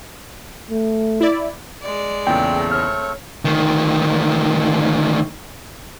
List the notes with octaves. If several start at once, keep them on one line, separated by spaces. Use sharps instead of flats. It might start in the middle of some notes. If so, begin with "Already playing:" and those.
A3
E4 D5
G#3 D5
E2 A#2 C#3 A3 C4 A4 G5
C#5 F6
D2 D#3